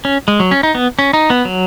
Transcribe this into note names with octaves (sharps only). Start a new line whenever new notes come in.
C#4
G#3
F#3
C#4
D#4
B3
C#4
D#4
B3
F#3